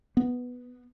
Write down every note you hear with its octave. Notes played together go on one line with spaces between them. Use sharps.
B3